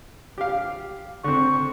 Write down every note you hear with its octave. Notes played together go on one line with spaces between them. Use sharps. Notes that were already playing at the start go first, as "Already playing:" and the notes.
G4 F5
D3 C4 C#6